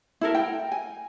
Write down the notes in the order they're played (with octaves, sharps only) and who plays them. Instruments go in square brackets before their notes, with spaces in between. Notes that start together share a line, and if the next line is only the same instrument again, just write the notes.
[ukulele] E4 A4 A#4
G5
G#5